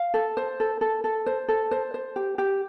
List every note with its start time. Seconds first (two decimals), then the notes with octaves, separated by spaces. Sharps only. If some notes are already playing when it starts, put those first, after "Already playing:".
Already playing: F5
0.14 A4
0.37 C5
0.60 A4
0.81 A4
1.04 A4
1.26 C5
1.48 A4
1.71 C5
1.94 C5
2.16 G4
2.38 G4